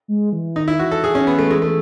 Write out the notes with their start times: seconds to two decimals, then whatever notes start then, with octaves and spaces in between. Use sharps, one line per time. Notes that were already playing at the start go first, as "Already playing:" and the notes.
0.08 G#3
0.33 E3
0.56 D#3 D#4
0.68 E4
0.79 E3 F#4
0.91 A4
1.04 G#4
1.15 C#4
1.27 B3
1.39 A3
1.51 G#3
1.62 A3